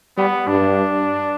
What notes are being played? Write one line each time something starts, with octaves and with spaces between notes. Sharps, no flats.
G3 B3
G2 D4